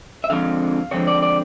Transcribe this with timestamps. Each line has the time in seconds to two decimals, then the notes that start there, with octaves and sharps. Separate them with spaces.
0.24 E5
0.30 D3 F3 G#3 C4 F5
0.91 D3 F3 G#3 C4 C#5
1.07 D5
1.22 D5